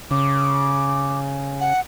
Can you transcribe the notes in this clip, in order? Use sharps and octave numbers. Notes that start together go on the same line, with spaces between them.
C#3 D6
F#5